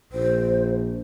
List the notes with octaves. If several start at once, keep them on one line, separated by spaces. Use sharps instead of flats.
A#1 C5